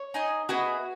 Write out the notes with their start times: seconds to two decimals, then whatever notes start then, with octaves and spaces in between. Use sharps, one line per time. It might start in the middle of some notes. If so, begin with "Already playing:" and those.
Already playing: C#5
0.14 D#4 G#4 D#5 G#5
0.49 B3 E4 F#4 G#4 D#5